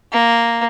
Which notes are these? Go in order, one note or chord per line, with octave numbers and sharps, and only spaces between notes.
A#3